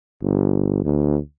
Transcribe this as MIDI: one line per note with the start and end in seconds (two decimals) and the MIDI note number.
0.22 0.83 31
0.85 1.18 38